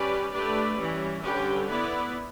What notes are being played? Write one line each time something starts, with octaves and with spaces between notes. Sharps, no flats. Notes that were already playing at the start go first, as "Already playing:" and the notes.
Already playing: G3 C#4 G4 B4 D5
A3 D4 G4 B4 D5
E3 G3 C#4
D3 G3 C#4 G4 B4
B3 E4 B4 D5